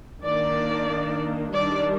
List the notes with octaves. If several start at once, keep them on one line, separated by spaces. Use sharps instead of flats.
D#3 A#3 D4 D5
D#3 G3 D4 D5